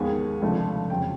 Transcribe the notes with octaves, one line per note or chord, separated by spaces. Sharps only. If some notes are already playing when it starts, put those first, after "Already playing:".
Already playing: D#2 D#3 G#3 B3 G#5
C#2 C3 F3 A3 D4
F2 C#3 F#3 G5